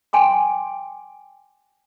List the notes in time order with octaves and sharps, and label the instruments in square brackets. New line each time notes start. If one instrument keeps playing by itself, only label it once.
[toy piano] G5 G#5 C6 D6